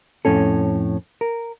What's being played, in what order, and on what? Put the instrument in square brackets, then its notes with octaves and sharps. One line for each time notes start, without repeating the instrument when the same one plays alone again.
[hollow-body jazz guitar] F2 A2 C#4 A4
A#4